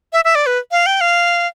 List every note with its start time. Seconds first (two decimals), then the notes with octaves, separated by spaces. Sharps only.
0.13 E5
0.25 E5
0.35 D5
0.46 B4
0.72 F5
0.86 G5
1.01 F5